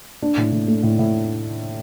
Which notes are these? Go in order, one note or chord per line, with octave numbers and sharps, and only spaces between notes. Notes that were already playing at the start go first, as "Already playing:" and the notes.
D4
A2
A2
A3
A2
A2